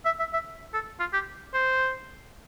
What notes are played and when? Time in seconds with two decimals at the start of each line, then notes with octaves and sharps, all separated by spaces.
0.05 E5
0.19 E5
0.33 E5
0.74 A4
1.00 F4
1.13 G4
1.54 C5